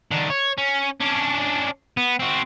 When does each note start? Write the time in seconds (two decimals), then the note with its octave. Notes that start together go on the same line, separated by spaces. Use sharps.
0.11 D#3 D4
0.30 C#5
0.58 C#4
1.01 C#4 D4
1.97 B3
2.20 C4 F#4